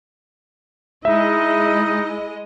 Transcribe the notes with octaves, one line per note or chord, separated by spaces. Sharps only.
G#3 D#4 E4 D#5 E5